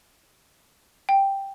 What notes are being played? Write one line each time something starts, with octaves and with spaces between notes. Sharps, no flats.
G5